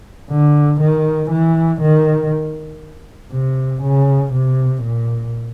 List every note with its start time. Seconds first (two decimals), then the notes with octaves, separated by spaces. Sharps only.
0.30 D3
0.81 D#3
1.31 E3
1.82 D#3
3.32 C3
3.82 C#3
4.33 C3
4.83 A#2